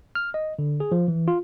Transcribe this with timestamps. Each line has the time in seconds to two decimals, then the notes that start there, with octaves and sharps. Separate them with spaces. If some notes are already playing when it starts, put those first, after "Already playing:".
0.15 F6
0.34 D#5
0.59 D3
0.80 G#4
0.92 F3
1.08 E3
1.28 F4